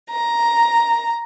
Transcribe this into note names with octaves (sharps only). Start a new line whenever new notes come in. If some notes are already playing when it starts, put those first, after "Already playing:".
A#5